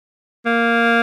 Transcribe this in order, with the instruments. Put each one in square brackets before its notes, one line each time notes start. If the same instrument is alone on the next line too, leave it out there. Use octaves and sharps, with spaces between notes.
[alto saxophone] A#3